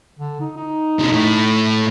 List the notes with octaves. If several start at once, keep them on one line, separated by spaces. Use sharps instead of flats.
D3
D#4
D#4
B2 D3
A2